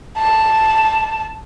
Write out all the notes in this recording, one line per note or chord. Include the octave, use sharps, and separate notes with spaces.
A5